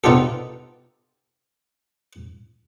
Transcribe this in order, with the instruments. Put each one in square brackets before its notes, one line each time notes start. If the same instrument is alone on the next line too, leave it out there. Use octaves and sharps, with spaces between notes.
[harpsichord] B3 D#4 F4 G4 A4